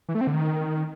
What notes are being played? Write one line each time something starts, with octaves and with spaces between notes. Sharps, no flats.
E3
A3
C4
D3
D#3